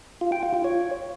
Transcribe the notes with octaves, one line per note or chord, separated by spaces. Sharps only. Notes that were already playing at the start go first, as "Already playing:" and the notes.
F4
G5
F4
F4
C#5